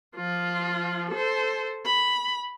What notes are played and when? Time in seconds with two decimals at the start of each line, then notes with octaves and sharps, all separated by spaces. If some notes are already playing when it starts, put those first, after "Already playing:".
0.16 F3 F4
1.11 A4 C5
1.85 B5